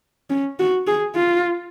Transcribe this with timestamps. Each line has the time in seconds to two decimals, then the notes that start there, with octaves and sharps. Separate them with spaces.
0.30 C#4
0.59 F#4
0.87 G#4
1.16 F4